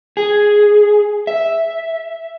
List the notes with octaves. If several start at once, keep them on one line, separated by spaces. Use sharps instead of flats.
G#4
E5